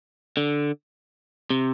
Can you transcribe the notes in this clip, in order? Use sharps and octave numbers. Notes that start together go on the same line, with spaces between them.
D3
C3